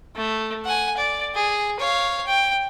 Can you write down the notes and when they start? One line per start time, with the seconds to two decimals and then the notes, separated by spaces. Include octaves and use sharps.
0.16 A3
0.65 F#5 G#5
0.97 D5
1.35 G#4
1.80 C#5 F5
2.27 G5